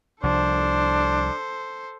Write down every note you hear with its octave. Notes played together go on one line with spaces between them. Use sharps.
C2 F3 D4 A4 C5